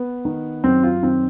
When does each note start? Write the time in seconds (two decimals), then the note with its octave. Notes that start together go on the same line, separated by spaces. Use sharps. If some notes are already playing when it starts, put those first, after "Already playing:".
Already playing: B3
0.25 D#3
0.64 F#2 C4
0.83 F4
1.03 D#3 C4